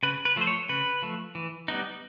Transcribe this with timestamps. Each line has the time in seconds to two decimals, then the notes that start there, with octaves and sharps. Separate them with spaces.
0.03 C#3 B4
0.25 B4
0.36 F3 A3 C5
0.47 C#5
0.69 C#3 B4
1.02 F3 A3
1.35 E3
1.68 G3 B3 D#4